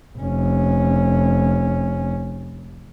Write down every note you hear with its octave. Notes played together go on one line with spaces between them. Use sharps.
F1 C#4